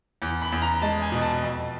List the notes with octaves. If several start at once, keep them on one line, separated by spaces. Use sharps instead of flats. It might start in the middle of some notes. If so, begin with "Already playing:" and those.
E2
B5
E2
A#5
G#3 A5
G#5
B2
A5
F2